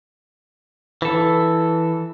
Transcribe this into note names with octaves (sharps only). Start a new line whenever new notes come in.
E3 A4